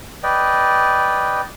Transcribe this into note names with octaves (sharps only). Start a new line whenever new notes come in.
B4 D5 D#5 G5